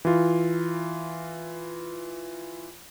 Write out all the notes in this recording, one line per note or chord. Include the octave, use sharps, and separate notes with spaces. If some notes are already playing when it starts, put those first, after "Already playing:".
E3 F4